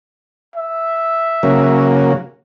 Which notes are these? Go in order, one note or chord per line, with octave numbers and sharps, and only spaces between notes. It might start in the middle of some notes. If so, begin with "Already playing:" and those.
E5
C#3 F#3 A#3